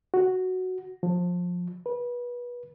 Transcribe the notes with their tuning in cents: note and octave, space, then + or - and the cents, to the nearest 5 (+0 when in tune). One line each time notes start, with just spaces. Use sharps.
F#4 +0
F3 +20
B4 -25